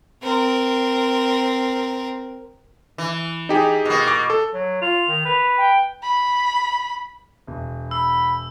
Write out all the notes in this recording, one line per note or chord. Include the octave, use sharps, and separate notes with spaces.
C4 A#4
E3
D#4 G4 G#4
B2 A#3
D6
A4
F#3
F4 F7
D#3
B4
G5
B5
E1
B5 E6